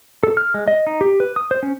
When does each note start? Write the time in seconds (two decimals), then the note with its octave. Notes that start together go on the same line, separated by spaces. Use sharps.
0.23 A4
0.37 F6
0.54 G#3
0.68 D#5
0.87 D#4
1.01 G4
1.20 B4
1.36 D#6
1.51 C5
1.63 C#4